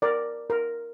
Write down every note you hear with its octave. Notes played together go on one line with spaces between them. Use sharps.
A#4 D5
A#4